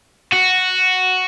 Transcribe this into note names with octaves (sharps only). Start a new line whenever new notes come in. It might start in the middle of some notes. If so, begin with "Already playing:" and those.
F#4